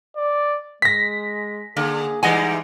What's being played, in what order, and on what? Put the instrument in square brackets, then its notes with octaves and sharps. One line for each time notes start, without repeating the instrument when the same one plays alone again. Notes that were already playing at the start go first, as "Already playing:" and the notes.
[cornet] D5
[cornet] G#3 [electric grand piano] A#6 B6
[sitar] D3 [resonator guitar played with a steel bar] A#3 [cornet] G#4
[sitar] E3 G3 G#3 [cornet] D#4 [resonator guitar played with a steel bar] D#5 F#5 G#5